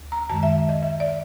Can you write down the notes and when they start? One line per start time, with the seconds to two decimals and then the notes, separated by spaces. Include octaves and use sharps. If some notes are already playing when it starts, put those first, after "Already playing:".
Already playing: D2
0.12 A#5
0.30 F#2 D#3 G#3 A5
0.43 E5
0.69 D#5
0.82 E5
1.00 D5